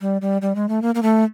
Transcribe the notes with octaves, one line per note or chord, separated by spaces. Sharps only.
G3
G3
G3
G#3
A3
A#3
A#3
A3